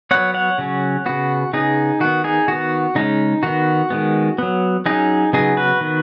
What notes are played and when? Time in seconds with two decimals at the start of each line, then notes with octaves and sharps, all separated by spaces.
0.11 F#3 B3 C#5 F#5
0.34 C#5 F#5
0.58 C#3 F#3 C#4
1.06 C#3 B3 F#4
1.53 C#3 B3 D#4 G#4
2.00 D#3 B3 F#4
2.24 D#4 G#4
2.48 D#3 B3 F#4
2.95 C#3 G#3 C#4 D#4
3.43 D#3 B3 F#4
3.90 D#3 G#3 B3
4.38 F#3 B3
4.86 F#3 C#4 D#4 G#4
5.33 C#3 F#3 B3 D#4 G#4
5.57 F#4 B4
5.81 D#3 B3